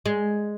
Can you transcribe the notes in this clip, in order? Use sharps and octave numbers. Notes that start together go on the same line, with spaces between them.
G#3